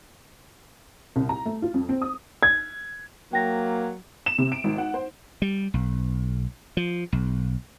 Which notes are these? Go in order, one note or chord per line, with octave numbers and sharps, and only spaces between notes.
C2
A#5
A3
F4
F2
C4
D#6
G#6
F#3 A#3 G5 A#6
E7
C3
D7
G#1
F#5
C5
G3
B1
F3
B1